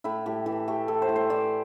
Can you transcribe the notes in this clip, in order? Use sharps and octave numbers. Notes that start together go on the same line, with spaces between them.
A2 E4
A2 G4
E3 A4
A3 G4
A2 A4
C5
A2
C5
E3 D5